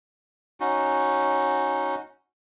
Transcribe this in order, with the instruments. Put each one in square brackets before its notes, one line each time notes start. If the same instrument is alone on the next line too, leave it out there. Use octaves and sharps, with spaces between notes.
[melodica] C#4 D#4 F#4